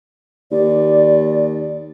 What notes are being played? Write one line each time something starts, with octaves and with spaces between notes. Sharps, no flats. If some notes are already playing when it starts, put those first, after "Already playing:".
D#2 D5